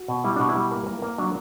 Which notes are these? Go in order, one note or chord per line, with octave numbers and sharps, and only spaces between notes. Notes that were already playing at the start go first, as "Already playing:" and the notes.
Already playing: F#4
B2
G3 E4
B2 D4
E4
G3
A#3
A#3
A#3
F#3 D4